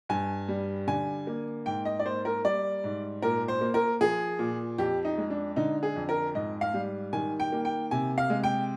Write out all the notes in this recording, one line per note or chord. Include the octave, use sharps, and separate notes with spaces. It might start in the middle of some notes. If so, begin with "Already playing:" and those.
G2 G#5
G3
D3 G#5
A#3
G#2 G5
D#5
D5
A#3 C5
A#4
G3 D5
G#2
A#2 A#4
C5
A#3
A#4
F3 G#4
A#2
F2 G4
D#4
G#3
D4
D3 D#4
G#4
F2
A#4
G#2 D#5
F5
G3
D#3 G#5
G5
A#3
G5
C3 G#5
F5
G#3
G5